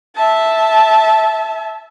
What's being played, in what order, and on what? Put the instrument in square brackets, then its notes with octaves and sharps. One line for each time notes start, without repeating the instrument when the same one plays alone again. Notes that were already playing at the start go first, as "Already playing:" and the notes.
[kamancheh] E5 A5